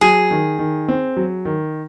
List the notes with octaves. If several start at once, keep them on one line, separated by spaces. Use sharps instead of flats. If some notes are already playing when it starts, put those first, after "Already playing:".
F#3 G#4
D#3
D#3
C4
F#3
D#3